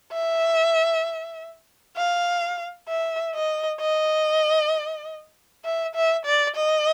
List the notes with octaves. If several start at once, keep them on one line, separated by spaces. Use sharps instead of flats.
E5
F5
E5
D#5
D#5
E5
E5
D5
D#5